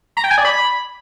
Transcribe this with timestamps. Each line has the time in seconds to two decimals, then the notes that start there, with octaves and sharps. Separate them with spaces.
0.17 A#5
0.24 G5
0.31 G#5
0.38 D5
0.45 B5